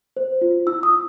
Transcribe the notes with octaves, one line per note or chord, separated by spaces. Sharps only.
C5
F4
E4 E6
D#6
E4